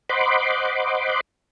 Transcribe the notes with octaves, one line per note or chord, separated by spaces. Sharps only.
C5 D#5 F#5 B5 C6 D6